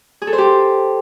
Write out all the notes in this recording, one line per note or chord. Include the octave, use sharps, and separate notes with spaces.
G#4
A4
C5
G4